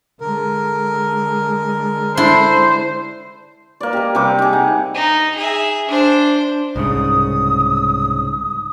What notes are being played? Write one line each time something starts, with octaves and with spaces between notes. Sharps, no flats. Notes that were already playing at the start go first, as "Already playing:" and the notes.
D3 G#3 A#4
D4 E4 C5 C6
A#3 D5
G4 D#5
C3 G3 D6
D#4 G#4
F#5
D#4
G#4 E5
D4 C5
C2 G#2 C#3 D#6